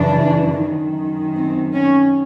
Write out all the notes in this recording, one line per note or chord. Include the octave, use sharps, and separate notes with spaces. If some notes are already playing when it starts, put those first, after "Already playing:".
Already playing: F#2 C#3 E3 D4
F#2 D#3
C4
C#4